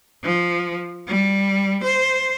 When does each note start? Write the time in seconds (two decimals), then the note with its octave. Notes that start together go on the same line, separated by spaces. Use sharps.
0.24 F3
1.08 G3
1.84 C5